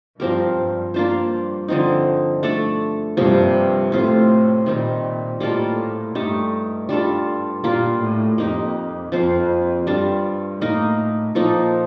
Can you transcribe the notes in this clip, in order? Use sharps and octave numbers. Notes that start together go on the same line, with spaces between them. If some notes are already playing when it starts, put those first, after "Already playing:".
G2 F3 C4 G4 A#4
G2
G2 A#3 D4 F4 C5
D3 F3 C4 D#4
A3 D4 A4 D5
G2 C3 F3 A#3
A2 C4 F4 C5
A#2 D#3 G3 C4
A2 G3 A#3 F4 A4
G2 A3 D#4 G4
G2 G3 D4 F4 A4
A#2 G3 A#3 F4
A2
F2 A#3 D#4 G4
F2 F3 C4 F4 C5
G2 G3 D4 F4
A2 A#3 D#4 A#4
A#2 F3 A#3 D#4 A4